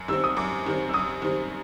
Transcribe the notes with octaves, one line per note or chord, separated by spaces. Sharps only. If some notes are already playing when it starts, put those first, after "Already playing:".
Already playing: F#2
D#3 G3 C4 E6
D#6
F#2 D6
D#3 G3 C4
E6
F#2 D#6
D#3 G3 C4